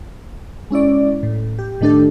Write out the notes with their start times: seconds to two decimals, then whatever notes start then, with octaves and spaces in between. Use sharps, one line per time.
0.71 G#3 C#4 E4 D5
1.23 A2
1.59 G4
1.81 A2 D#3 A3 D4 G4 A4